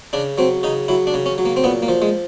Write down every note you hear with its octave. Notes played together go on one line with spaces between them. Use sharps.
C#3 D4
F#3 C4
C#3 D#4
F#3 E4
D4
C#3
C#4
F#3
A#3
C4
A#2 B3
A#3
F3
G#3